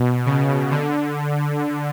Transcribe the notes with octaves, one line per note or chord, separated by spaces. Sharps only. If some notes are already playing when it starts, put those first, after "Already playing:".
Already playing: B2
C#3
D3